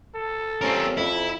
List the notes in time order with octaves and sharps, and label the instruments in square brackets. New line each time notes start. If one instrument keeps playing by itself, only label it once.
[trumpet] A4
[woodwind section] F3 G3 C#4 [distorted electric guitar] C4 A#4
[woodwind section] F2 [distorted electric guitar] E4